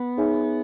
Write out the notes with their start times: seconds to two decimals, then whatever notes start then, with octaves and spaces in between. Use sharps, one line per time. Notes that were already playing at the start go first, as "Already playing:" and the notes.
Already playing: B3
0.17 D#4 G#4 C#5 E5 G#5